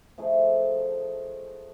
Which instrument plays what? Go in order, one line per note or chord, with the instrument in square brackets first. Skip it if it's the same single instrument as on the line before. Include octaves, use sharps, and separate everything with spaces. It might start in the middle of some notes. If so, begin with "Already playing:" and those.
[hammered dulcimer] F3 A3 D#4 G#4